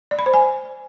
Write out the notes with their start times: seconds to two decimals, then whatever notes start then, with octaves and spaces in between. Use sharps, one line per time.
0.11 D5
0.19 B5
0.26 C5
0.34 G#5